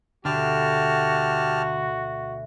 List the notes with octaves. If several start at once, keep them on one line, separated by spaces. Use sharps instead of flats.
D2 B2 D3 F#4 G4 A5 F6